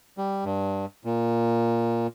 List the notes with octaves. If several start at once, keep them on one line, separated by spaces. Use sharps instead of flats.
G3
G2
A#2